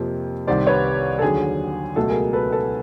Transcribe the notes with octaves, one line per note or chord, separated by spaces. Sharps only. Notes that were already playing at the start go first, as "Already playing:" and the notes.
Already playing: F2 C3 F3 A#3
C2 C3 D#3 C5 D5
B4 C#5
A4
D#2 D3 F#3 G#4
C#2 B2 F#3 A3 A4
G#4 A#4
A4 B4
A4 B4